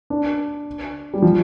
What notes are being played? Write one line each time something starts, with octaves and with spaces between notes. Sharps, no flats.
D4
G3
F3